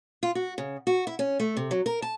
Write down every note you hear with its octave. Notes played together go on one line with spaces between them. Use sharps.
F4
F#4
C#3
F#4
E4
C#4
A3
C3
F#3
A#4
A5